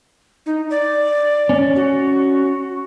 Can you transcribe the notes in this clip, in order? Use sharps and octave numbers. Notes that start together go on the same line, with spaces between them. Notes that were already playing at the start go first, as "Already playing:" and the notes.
D#4
D5
C#4
F#4